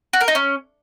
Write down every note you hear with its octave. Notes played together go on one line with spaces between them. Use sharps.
F#4
A#4
D#4
C#4